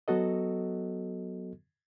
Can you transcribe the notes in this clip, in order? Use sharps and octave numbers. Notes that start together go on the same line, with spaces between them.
F#3 B3 F#4 A4 D#5